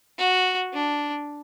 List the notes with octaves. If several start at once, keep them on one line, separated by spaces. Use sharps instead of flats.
F#4
D4